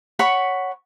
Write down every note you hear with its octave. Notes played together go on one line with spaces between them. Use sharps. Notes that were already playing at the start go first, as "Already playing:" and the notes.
C#5 F#5 B5 C#6